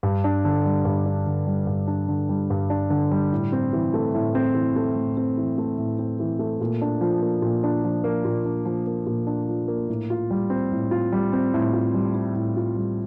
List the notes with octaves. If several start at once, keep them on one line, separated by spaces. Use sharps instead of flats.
G2
D4
D3
G3
G2
D4
D3
G3
G2
D4
D3
G3
G2
D4
D3
G3
A2
C4
E3
A3
A2
C4
E3
A3
A2
C4
E3
A3
A2
C4
E3
A3
A#2
D4
F3
A#3
A#2
D4
F3
A#3
A#2
D4
F3
A#3
A#2
D4
F3
A#3
A2
F4
G3
C4
A2
F4
G3
C4
A2
F4
G3
C4
A2
F4
G3